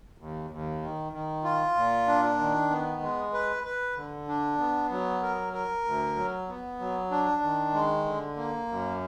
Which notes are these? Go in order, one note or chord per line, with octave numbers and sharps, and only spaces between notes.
D#2
D#2
D#3
D#3
F4
A#2
D4
D#3
B3
G#3
B4
B4
D3
D4
B3
F#3
A#4
A#4
D2
F#3
B3
F#3
D4
D#3
G#3
D3
A#3
F#2